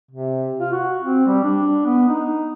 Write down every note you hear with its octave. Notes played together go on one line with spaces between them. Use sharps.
C3
F4
F#4
C4
G3
D4
B3
D#4